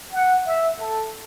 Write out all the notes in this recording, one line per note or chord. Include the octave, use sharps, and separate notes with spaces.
F#5
E5
A4